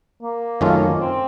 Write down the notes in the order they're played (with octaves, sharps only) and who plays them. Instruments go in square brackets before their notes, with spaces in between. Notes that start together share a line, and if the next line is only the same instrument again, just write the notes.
[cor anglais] A#3
[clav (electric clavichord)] F#2 D#3 A3 C#4 F4
[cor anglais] C4